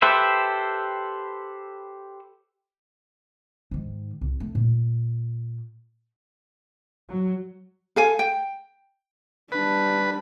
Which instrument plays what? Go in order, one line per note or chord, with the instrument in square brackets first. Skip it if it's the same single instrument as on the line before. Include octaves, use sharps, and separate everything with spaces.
[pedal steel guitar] G4 A4 B4 C5 E5
[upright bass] G#2 D#3
C2
A3
A#2
[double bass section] F#3
[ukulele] A4 F5 G#5
G5
[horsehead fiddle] G3 D4 [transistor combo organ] B4